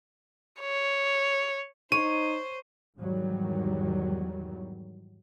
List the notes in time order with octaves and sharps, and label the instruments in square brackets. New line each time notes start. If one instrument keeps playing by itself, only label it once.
[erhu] C#5
[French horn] D#4 [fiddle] C5 [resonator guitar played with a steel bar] C#5 [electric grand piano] D#7
[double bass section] E2 G#2 D#3 F#3 G3